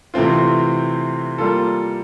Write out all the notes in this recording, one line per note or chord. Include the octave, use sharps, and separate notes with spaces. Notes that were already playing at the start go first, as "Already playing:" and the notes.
C3 E3 A3 C4 F4
G3 A#3 F4 A4